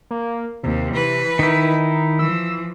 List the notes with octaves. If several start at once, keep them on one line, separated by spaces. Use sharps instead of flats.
A#3
D#2 C3
E3 B4
D#3 D#4 E4
E3 F3 E6